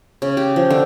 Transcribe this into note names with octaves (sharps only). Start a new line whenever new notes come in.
C#3
G4
F3
D3